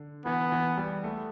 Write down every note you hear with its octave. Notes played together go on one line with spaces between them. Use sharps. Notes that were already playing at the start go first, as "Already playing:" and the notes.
Already playing: D3
E3 B3
E3
G3
A3